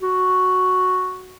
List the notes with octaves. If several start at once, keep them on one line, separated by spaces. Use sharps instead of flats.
F#4